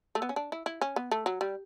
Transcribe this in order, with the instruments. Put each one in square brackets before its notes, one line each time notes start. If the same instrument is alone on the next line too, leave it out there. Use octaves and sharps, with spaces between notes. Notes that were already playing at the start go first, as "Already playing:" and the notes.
[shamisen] A3
B3
C#4
D4
E4
E4
C#4
B3
A3
F#3
G3